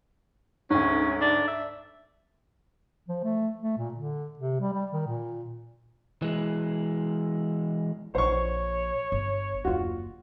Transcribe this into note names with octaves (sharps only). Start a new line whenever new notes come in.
D2 G#2 C#4
D4
E5
F3
A3
A3
A#2
D3
C3
G3
G3
D#3
A#2
E3 G#3
A#1 C5 C#5 C#6
G1
F#1 D#2 F4 F#4